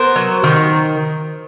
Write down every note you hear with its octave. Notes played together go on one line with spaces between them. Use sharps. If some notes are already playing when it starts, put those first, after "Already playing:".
Already playing: B3 A#4 C5
F#3
D#3